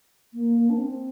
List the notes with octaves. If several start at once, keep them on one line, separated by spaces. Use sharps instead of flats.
A#3
D4
C4